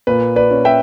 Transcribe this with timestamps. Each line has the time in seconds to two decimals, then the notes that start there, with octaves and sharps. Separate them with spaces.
0.07 A#2 B4
0.36 B4 D5
0.51 C#4
0.65 E5 G5